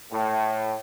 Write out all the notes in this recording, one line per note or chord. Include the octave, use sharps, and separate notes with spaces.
A2